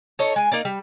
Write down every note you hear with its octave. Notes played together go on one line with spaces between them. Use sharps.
D#4 A4 C#5
G#3 G#5
A#3 D#4 D5
G3